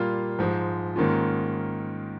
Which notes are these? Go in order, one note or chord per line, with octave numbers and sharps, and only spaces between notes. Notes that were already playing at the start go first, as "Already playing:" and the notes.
Already playing: A#2 G3 A#3 F4
G#2 F3 G#3
G#2 D#3 A#3 C#4 F4